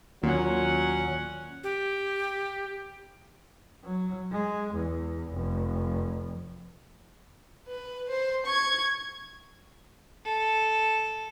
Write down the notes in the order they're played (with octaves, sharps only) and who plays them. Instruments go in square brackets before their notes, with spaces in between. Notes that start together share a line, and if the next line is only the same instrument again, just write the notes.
[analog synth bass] D#2 [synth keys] A#2 [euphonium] F#3 [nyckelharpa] C#4 F#5
[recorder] G4
[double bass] F#3
G#3
E2
F1
[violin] B4
C5
C#6 G#6
[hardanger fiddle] A4